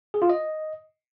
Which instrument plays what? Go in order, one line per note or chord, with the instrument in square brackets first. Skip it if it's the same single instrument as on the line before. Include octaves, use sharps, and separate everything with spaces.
[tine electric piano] G#4
F4
D#5